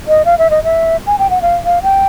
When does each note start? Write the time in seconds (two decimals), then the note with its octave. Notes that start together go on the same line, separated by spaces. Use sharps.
0.08 D#5
0.25 F5
0.38 E5
0.50 D#5
0.64 E5
1.07 G#5
1.19 G5
1.30 F#5
1.42 F5
1.65 F5
1.83 G5